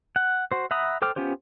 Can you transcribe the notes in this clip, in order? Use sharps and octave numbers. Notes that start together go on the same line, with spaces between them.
F#5
F#4 C5
E5 F#5 A#5 B5 D#6
A4 C5 G5 D6 F6
B3 C#4 F4 G4 C5